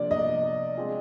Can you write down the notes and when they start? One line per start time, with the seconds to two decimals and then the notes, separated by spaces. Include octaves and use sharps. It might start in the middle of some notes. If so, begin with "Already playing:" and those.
Already playing: C3 F3 A#3 D4 D5
0.11 D#5
0.77 G#3 C4 F4 G#4